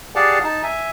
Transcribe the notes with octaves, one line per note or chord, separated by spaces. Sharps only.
G4 G#4 D5 F5 F#5 A5
D#4 A5
E5 G#5